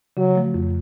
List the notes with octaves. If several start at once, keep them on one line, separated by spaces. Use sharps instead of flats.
C#3 F#3
F3 A3
F2